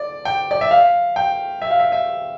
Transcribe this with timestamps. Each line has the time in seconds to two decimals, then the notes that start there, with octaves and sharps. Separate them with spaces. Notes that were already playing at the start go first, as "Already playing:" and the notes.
Already playing: D5
0.25 G5
0.51 D5
0.61 E5
0.71 F5
1.16 G5
1.62 E5
1.70 F5
1.79 E5
1.92 E5